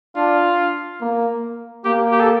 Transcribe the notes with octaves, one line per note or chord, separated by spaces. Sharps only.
D4 F4
A#3
A#3 G4
G4
A4